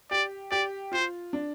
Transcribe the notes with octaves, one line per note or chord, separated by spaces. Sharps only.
G4 D5
G4 D5
F4 C5
D4